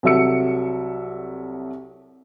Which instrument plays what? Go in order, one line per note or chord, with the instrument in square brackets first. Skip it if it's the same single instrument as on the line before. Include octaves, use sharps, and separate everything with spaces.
[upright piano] C2 F#3 A4 E5 E6 C#7